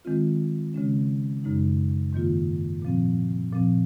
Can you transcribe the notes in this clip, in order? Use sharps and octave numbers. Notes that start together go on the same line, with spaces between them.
D#3 G#3 C4 F4
C#3 G#3 C#4
F#2 C#3 G#3 D#4
G#2 D#3 A#3 F4
A#2 F3 C4
A#2 F3 C4